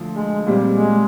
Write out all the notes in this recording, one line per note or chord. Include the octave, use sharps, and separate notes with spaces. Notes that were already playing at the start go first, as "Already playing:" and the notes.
Already playing: D2 F3
G#3
A#2 G3 C4
G#3